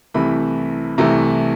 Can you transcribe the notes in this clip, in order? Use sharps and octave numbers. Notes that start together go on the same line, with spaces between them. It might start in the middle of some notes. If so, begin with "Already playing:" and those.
C2 C3 E3 A3 B5
C2 C3 E3 A3 A#5